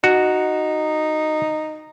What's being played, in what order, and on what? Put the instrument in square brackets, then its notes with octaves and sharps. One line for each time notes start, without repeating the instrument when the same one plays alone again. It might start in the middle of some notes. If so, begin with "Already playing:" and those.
[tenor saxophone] D#4 [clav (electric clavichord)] F#4